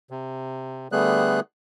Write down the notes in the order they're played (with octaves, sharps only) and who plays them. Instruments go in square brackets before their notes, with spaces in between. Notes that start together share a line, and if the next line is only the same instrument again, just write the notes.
[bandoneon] C3
D3 G3 A3 B3 G#4 F#6